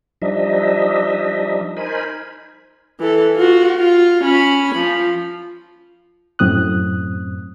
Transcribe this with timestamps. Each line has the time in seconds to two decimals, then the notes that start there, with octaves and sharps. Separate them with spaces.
0.22 F3 G3 D4 D#4 D#5 E5
1.77 D#4 A#4 C5 G#5 B5
3.00 E3 A4
3.36 F4 F#4
3.78 F4
4.24 C#4 B5
4.75 F3
6.39 F#2 A2 C4 D#6 F#6